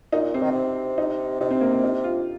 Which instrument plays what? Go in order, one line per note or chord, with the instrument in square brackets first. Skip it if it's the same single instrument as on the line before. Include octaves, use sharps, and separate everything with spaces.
[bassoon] A#2 [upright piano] D#4
[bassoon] C3 [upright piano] C4
[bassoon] D#3
C3
[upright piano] D#4
[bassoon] C3 [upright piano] D#4
[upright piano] C4
A#3
C4
D#4
F4